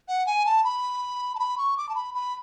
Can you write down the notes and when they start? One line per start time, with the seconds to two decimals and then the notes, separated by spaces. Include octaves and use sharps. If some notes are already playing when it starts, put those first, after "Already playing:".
0.08 F#5
0.26 G#5
0.46 A5
0.64 B5
1.35 A5
1.39 B5
1.58 C#6
1.77 D6
1.89 A5
1.95 B5
2.14 B5